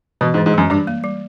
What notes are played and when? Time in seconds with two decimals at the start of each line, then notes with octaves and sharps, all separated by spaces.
0.21 B2 E3
0.34 G#2
0.38 E3
0.46 G#2
0.54 F#2 G#3
0.70 G2 G3
0.87 A#3
1.04 G3